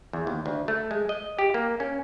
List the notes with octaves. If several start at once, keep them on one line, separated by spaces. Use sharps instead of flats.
E2
D#2
D2
A3
G#3
D#5
G4
A#3
C#4